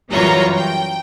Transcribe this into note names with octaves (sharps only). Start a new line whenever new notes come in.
F#2 E3 G3 F4 C#5 A#5
G5